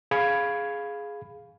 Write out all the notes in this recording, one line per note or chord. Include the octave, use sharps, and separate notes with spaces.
G#4 F5 B5 G#6